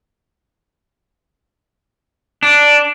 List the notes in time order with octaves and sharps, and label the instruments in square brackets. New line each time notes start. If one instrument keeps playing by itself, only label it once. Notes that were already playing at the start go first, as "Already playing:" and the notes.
[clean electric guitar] D4